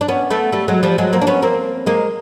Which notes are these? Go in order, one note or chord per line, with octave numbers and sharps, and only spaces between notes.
D4
B3 C#4
A3 B3
G3 A3
F#3 G#3
F3 G3
F#3 G#3
A#3 C4
D4
B3 C#4
A#3 C4
G#3 A#3